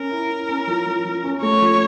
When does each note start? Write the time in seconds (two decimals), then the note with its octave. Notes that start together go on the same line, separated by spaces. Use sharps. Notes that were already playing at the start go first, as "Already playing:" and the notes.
Already playing: C#4 A#4
0.11 E4
0.30 E4
0.49 C#4
0.67 F3
0.86 F3
1.05 F3
1.24 C#4
1.42 A3 C#5
1.61 F3